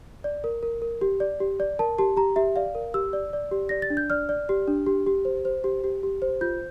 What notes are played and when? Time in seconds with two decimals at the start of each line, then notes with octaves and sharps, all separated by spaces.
0.24 D5
0.44 A#4
0.63 A#4
0.82 A#4
1.01 G4
1.20 D5
1.40 G4
1.60 D5
1.79 A#4 A5
1.98 G4 A5
2.17 G4 A#5
2.36 G4 E5
2.56 D5 F5
2.75 A#4
2.94 G4 E6
3.13 D5
3.33 D5
3.51 G4
3.69 D5 A#6
3.82 A6
3.90 D4
3.97 G6
4.10 D5 F6
4.29 D5
4.49 G4
4.68 D4
4.86 G4
5.07 G4
5.25 C5
5.45 C5
5.64 G4
5.84 G4
6.03 G4
6.22 C5
6.41 F4 G6